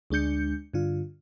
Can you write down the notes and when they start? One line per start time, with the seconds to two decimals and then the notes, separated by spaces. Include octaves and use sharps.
0.10 D2 G#3 D4 G6 C#7
0.74 G2 D3 F4